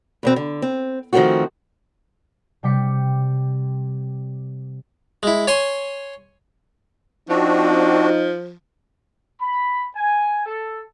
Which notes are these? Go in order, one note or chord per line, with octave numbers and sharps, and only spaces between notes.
E2 B2 C4
D3
C4
D#3 F3 G3 A3 C4 F#4
C3 G3 G5 D6 B6 C#7
G#3 E4
C#5 G#5 C6 C#6
F3 C4 D4 D#4 F#4
B5
G#5
A4